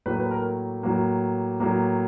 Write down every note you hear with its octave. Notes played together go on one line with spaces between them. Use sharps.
A2 F#3 A#3 B4
B4
A#4
A2 F#3 A#3
A2 F#3 A#3